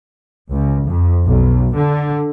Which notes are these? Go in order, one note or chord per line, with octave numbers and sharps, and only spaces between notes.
C#2
F2
B1
D3